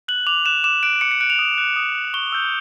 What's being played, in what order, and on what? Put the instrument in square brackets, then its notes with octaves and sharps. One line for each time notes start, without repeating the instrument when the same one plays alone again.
[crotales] F#6 F#7
D6 F7
F#6 E7
D6 E7
F#6 D7
D6 C#7
C#7
F#6 D7
F7
D#6
F#6
D#6
F#6
C#6 G7
E6 G6